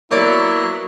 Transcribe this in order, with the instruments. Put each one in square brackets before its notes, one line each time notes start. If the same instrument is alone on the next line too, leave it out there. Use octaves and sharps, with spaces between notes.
[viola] F#3 B3 [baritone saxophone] A#3 [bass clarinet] E4 [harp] C#5 D5